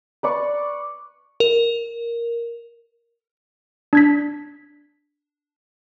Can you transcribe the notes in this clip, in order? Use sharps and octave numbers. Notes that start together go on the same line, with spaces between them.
B4 D5 C#6
A#4
D4 G#6 B6